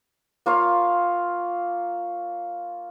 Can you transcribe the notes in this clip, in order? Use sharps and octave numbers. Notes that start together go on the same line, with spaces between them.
A#3 F4 C#5 F5